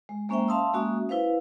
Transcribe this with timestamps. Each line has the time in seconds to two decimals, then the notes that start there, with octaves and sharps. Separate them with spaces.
0.09 G#3
0.29 G#3 A#3 C#4 C5 E5 G5
0.48 E5 F5 A5 C6 D#6 E6
0.73 G#3 A#3 C#4 F#4 E5 D#6
1.09 E4 B4 C5 F5